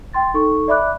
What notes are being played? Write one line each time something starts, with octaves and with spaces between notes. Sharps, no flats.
G5 C6 A6
D#4 A4 C#6
D5 E5 B5 D6 F#6